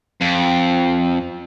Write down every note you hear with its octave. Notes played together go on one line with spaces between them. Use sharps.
F2